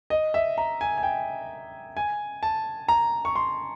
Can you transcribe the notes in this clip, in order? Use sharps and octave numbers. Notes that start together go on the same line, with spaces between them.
D#5
E5
A#5
G#5
G#5
G5
G#5
A5
A#5
C#6
C6